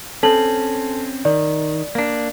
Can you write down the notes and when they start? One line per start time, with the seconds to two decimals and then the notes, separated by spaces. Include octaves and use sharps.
0.23 C4 C#4 A4 A5 F#7
1.25 D#3 D5
1.95 A#3 D4